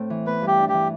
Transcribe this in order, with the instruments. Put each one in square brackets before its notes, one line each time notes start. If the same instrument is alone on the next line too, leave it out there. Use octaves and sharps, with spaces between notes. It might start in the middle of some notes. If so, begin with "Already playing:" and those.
Already playing: [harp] A2 A3 C4
E3
[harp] B3 [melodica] B4
[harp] G2
[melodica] G4
[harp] D4
[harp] E3 [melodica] G4